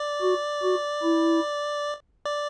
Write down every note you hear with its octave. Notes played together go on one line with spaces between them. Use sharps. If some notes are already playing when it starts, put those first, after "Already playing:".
Already playing: D5
F#4
F#4
E4
D5